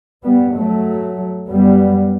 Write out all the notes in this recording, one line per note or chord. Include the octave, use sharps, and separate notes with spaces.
G2 G3 B3
F#3 A3
F#2 G3 B3